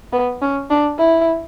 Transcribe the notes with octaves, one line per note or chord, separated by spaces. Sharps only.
B3
C#4
D4
E4